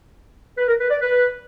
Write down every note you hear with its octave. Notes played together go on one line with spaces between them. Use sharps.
B4
A#4
B4
D5
B4